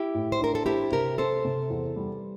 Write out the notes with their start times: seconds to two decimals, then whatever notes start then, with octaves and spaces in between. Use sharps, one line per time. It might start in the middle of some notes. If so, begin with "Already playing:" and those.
Already playing: E4 G4
0.14 A2
0.32 C5
0.40 D4 A#4
0.55 A4
0.66 C4 E4 G4
0.92 C3 G4 A#4
1.18 C4 A4 C5
1.44 C3
1.70 E2
1.96 G3